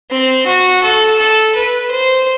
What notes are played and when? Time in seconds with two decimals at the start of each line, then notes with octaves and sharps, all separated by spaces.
0.10 C4
0.46 F#4
0.83 A4
1.19 A4
1.55 B4
1.91 C5